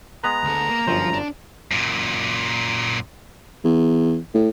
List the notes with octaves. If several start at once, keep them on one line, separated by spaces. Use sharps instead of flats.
G#3 B3 B4 A#5
D2 A4
A#3
G1 F#2 F3 C5
D4
F#2 A#2
E2
A2